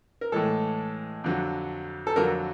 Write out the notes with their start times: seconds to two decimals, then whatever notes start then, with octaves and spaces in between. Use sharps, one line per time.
0.21 A#4
0.32 A2 E3 G#3 A4
1.24 F2 D3 F#3
2.07 A4
2.16 F2 D3 F#3 A#4